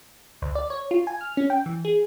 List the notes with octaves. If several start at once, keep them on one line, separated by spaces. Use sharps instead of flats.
D2
D5
C#5
F4
G#5
F6
C#4
G5
E3
G#4